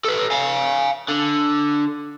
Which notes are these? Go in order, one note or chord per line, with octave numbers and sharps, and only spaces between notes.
A4 B4
F5 G#5
D3